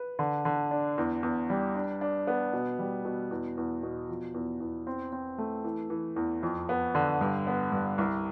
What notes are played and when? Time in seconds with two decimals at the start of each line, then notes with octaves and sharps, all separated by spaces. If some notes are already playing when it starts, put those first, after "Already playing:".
Already playing: B4
0.19 D3
0.45 D3
0.71 D4
0.98 E2
1.23 E2
1.50 G3
1.75 D4
2.01 D4
2.27 B3
2.53 B2
2.79 G3
3.05 B2
3.31 E2
3.57 E2
3.83 B2
4.09 F3
4.34 E2
4.60 E2
4.87 C4
5.13 C4
5.38 A3
5.65 E3
5.90 E3
6.16 E2
6.43 F2
6.69 B3
6.95 D3
7.21 G2
7.47 B3
7.72 G2
7.98 C2